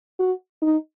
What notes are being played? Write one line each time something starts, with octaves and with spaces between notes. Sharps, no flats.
F#4
D#4